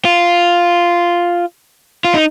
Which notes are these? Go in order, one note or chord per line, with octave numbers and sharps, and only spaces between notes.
F4
F4
D#4